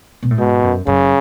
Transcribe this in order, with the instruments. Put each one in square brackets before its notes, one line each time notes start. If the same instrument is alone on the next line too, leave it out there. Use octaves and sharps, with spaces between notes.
[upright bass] B2
A2
[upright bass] G#2 [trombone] B2
[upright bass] F#2
[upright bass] F#2 [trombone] C#3